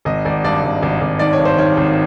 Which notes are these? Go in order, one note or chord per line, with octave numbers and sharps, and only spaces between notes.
G#1 D#5
G#1 D5
G2 D5
G#1
G#1
G#1
D#3 D5
C#5
G2
C5
D#3 C#5
G#1